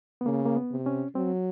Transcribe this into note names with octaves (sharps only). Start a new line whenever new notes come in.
B3
C#3 A#3
A#3
B3
C3
C#4
F#3 C4